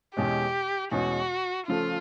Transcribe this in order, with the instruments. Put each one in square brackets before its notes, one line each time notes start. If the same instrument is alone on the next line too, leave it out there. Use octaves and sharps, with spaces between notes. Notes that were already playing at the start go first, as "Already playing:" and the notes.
[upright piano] E2 B2 G#3 C#4 [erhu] G4
[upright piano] E2 B2 G#3 C#4 [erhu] F#4
[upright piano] C#3 F3 A3 [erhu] F4